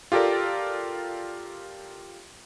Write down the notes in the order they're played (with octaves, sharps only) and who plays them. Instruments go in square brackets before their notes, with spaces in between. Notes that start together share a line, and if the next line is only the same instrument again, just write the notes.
[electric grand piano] F4 G4 A4 A#4 D5